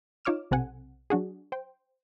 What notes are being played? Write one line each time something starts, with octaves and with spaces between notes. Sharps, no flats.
D#4 F4 C#5 D6 F6 E7
B1 C3 C4 A4 F#5 G#5
F#3 D4 F#4 G#4
C5 G5